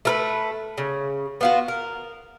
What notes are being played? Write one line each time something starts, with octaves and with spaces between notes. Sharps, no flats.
A3 A#4 B4
C#3
B3 F4 F#4
A#4